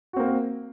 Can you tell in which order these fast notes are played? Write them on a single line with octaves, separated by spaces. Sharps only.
F#4 C4 A#3